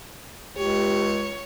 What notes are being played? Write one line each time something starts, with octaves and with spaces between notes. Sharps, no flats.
C#2 G4 C#5